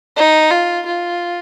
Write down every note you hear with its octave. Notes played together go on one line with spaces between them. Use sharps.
D#4
F4
F4